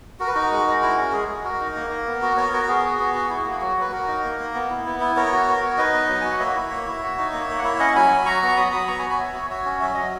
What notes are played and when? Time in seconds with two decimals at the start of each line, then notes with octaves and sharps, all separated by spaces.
0.20 F#4 A#4
0.27 B4
0.34 D#4 F#4 A#4
0.52 G#3
0.67 G#3
0.82 E4
0.97 C#4 F#4
1.13 G#3 G#4
1.28 G#3 G#4
1.44 F#4 A#4
1.60 D#4
1.76 A#3
1.90 A#3
2.07 B3
2.22 F#4
2.37 B3 A#4 C#5
2.53 F#4 A#4
2.68 B3 G#4
2.84 F#4
3.00 B3
3.14 F#4
3.30 E4 F#4
3.45 A#3 G#4
3.61 F#3 F#4
3.77 F#3 B4
3.92 F#4 A#4
4.07 D#4
4.24 A#3
4.39 A#3
4.54 B3
4.70 E4
4.86 B3
5.00 E4
5.16 B3 A#4 C#5
5.32 F#4
5.48 B3
5.62 F#4
5.78 D#4 B4 D#5
5.93 B3
6.09 F#3
6.21 F#4 G#5
6.30 F#5
6.40 A#3 C#5 E5
6.55 E4
6.71 A#3
6.87 E4
7.03 F#4
7.18 D#4
7.33 A#3
7.49 A#3
7.58 F#5
7.64 E4 C#5 E5
7.79 C#4 D#5 F#5
7.88 C#6
7.95 F#3 G#5 B5
8.10 F#3
8.26 F#4 A#5 C#6
8.42 B3
8.48 C#6
8.57 F#3 B5 D#6
8.72 F#3 B5 D#6
8.88 B3 A#5 C#6
8.99 G#5 B5
9.04 F#4
9.09 G#5 B5
9.19 B3 C#5 E5
9.34 F#4
9.50 F#4 C#5 E5
9.65 C#4
9.81 F#3 E5
9.94 F#3 D#5